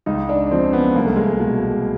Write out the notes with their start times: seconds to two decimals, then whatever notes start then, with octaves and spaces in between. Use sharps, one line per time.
0.06 C#2 D#4
0.29 D4
0.51 C#3 F3 C4
0.73 B3
0.95 C2 A#3
1.06 A3
1.16 G#3
1.27 A3
1.40 B2 G#3